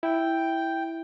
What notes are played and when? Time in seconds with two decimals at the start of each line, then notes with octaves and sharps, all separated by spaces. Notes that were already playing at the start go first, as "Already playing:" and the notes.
0.03 E4 G5